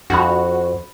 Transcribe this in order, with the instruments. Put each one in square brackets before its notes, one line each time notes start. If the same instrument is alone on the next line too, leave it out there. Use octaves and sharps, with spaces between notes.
[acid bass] F2 [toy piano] D4 B5 [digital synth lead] F#4